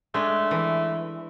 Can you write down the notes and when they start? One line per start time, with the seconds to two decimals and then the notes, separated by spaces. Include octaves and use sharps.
0.14 G#3 A3 D4
0.51 E3